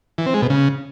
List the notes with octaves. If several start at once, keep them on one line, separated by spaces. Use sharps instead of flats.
E3
C4
G#3
B2
C#3